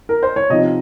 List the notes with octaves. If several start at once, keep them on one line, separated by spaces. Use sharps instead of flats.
A#4
C5
C#5
C3 F3 C4 D#4 D#5